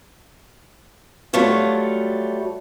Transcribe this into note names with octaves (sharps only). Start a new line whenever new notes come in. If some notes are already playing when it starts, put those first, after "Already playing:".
F#3 G3 A3 F4